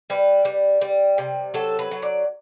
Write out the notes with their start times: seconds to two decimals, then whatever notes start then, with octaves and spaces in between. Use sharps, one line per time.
0.10 G3 B4
0.45 G3
0.81 G3
1.18 C3
1.54 F#3 A4
1.79 B4
1.91 F#3
2.03 D5